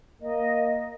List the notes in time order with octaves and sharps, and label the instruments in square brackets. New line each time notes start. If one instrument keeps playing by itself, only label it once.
[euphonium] A#3 [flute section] D#5